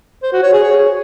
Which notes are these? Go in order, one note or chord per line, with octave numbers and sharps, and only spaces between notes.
C5
F#4
C#5
G#4
C#5